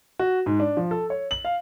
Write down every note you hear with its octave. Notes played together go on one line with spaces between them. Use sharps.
F#4
G#2
D4
F3
A4
C#5
F#7
F5